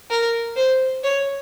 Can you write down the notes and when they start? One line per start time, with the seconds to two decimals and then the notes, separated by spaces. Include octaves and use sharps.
0.10 A#4
0.56 C5
1.03 C#5